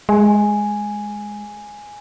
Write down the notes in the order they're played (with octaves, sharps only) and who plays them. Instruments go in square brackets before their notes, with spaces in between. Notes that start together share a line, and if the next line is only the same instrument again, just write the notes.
[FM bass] G#3 [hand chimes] G#5